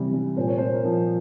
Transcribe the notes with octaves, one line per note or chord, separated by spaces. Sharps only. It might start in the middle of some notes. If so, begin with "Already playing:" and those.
Already playing: C3 E3 G3
G3
A#2 C5
C#5
A#2 C5
A#4
F3